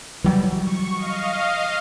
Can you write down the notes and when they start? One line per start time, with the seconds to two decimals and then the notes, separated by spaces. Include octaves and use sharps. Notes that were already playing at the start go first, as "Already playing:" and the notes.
0.24 E3 F#3 G3
0.60 C#6
0.94 D#5 F5